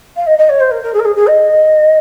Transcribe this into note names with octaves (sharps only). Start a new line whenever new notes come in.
F5
D#5
D#5
C#5
C5
A#4
A#4
G#4
A#4
G#4
G#4
D#5